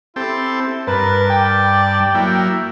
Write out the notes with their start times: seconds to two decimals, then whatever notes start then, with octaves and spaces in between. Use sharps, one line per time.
0.16 C4 E4 G4 A4
0.87 G2 A#4 B4 A5
1.30 D5 G5
2.15 F#3 A#3 E4